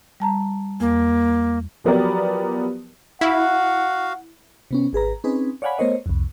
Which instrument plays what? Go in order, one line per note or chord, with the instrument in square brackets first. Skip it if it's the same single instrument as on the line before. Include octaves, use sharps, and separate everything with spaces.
[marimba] G3 A5 A#5
[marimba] E2 [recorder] A#3
[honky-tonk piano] F3 F#3 B3 G4 A#4 D5
[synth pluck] E4 [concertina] F#4 F5 [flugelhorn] F#5
[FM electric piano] C3 B3 C#4
G#1 G#4 B4 A#5
C4 C#4 D#4 G#4 B4
C#5 D5 F5 F#5 G#5 B5
A3 B3 A#4 C5 C#5 D#5
C2 F2